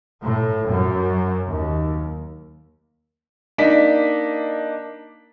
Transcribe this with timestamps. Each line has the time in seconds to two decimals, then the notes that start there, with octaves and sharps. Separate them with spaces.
0.21 A2
0.68 F#2
1.48 D#2
3.58 A#3 D4 D#4 B6